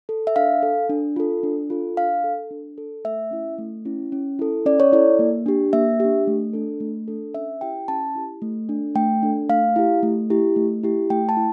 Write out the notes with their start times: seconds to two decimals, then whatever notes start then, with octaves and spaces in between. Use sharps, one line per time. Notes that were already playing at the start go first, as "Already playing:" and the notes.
0.09 A4
0.27 E5
0.36 D4 F5
0.63 A4
0.90 D4
1.16 F4 A4
1.43 D4
1.70 F4 A4
1.97 D4 F5
2.24 A4
2.51 D4
2.78 A4
3.04 A3 E5
3.31 C#4 E4
3.58 A3
3.85 C#4 E4
4.12 C#4
4.39 E4 A4
4.66 C#4 D5
4.80 C#5
4.93 E4 A4 D5
5.19 A#3
5.46 D4 G4
5.73 A#3 E5
6.00 D4 G4
6.27 A3
6.53 D4 A4
6.80 A3
7.08 D4 A4
7.34 C#4 E5
7.61 E4 G4 G5
7.88 C#4 A5
8.15 E4 G4
8.42 A3
8.69 D4 A4
8.95 A3 G5
9.23 D4 A4
9.49 A3 F5
9.76 E4 G4
10.03 A3
10.30 E4 G4
10.56 A3
10.83 E4 G4
11.10 A3 G5
11.29 A5
11.37 E4